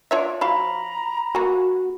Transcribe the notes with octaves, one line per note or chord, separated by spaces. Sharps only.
D4 F4 C#5 E5
F3 F#4 F5 A#5 B5
A#3 F#4 G#5